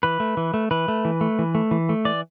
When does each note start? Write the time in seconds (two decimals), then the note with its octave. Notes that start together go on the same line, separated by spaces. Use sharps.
0.03 E3 B4
0.20 A3
0.37 E3
0.54 A3
0.71 E3 B4
0.88 A3
1.05 E3
1.21 A3
1.39 E3
1.55 A3
1.71 E3
1.89 A3
2.05 E3 D5